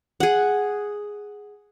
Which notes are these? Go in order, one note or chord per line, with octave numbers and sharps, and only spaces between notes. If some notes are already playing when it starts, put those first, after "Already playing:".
G#4 F#5